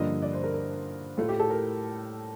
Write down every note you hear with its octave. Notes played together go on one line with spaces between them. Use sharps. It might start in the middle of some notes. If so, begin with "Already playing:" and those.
Already playing: G2 D3 F3 A#3 D#5
D5
C5
A#4
A#4
A2 A3 F4
G4
A4
A#4